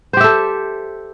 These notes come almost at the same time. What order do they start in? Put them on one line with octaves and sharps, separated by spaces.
C5 G4 E5 A4